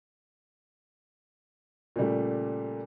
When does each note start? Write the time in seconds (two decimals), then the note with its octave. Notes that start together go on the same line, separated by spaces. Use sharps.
1.96 A#2 C#3 G3 A3